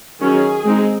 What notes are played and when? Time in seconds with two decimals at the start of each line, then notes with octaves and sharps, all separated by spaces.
0.20 D#3 F#3 C#4 G#4
0.64 G#3 C4 D#4